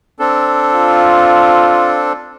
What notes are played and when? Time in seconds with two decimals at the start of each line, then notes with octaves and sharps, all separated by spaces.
0.19 C4 D4 A4
0.75 F4